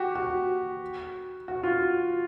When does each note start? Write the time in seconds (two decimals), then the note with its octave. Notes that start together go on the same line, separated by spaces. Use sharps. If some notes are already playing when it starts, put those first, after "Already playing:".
Already playing: F#4 G4
0.16 F#4
1.48 F#4
1.63 F4